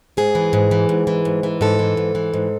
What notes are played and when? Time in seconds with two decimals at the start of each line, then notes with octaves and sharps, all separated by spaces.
0.17 G#2 G#4
0.35 E3
0.53 G#2
0.71 E3
0.89 G#2
1.07 E3
1.25 G#2
1.43 E3
1.61 G#2 A4
1.79 E3
1.97 G#2
2.15 E3
2.33 G#2